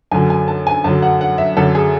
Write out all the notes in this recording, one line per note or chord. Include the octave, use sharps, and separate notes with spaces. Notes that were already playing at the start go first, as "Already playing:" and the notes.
F#2 D3 F#3 G#5
G#5
A5
G#5
F#2 D3 F#3 A5
F#5
F#5
E5
F#2 D3 F#3 A4
G#4